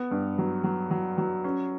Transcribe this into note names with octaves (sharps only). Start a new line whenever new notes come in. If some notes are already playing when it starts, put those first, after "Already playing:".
Already playing: B3
G2
F#3
F#3
F#3
F#3
C#4